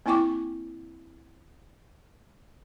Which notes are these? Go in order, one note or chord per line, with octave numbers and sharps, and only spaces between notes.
A#3 C4 E4 G5 C#6 D6